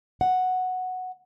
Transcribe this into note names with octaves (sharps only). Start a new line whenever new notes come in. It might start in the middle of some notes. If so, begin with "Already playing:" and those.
F#5